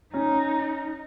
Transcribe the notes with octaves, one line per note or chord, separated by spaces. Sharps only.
C#4 D#4